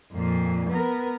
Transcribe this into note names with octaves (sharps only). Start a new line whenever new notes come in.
F2 A#2
B3 A#4